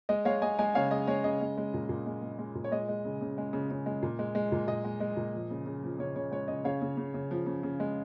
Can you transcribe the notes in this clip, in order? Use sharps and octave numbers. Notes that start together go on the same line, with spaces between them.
G#3 D#5
G#3 C#5 F5
G#3 D#5 G#5
G#3 D#5 G#5
C#3 C#5 F5
G#3 D#5
G#3 C#5
C#3 D#5
G#3
G#3
A#2
A#2
G#3
G#3
G#3
A#2
C#5
G#3 D#5
G#3
C#3
C#3
G#3
C#3
C#3
G#3
A#2
G#3
G#3
A#2
A#2 D#5
G#3
G#3
A#2
F3
C#3
C#3
F3
C#3 C#5
C#3 C#5
G#3 C#5
C#3 D#5
C#3 C#5 F5
C#3
C#3
C#3
F3
C#3
C#3
G#3